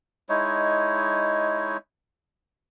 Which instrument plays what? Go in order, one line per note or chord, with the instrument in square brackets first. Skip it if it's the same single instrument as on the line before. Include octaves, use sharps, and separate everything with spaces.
[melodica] G#3 D#4 E4 C#5